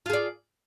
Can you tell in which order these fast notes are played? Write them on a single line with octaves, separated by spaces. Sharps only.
F4 G#4 D5